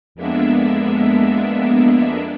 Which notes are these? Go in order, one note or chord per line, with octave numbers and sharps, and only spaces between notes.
F2 G#3 A#3 B3 D4 E5